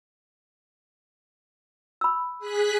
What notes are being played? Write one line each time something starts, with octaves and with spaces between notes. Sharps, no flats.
B5 E6
G#4 F#6 B6